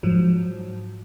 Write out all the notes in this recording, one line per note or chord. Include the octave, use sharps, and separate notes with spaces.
G#2 F3 F#3